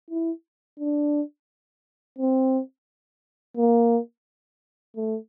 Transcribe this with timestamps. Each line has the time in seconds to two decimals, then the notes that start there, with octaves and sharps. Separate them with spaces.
0.11 E4
0.80 D4
2.19 C4
3.57 A#3
4.96 A3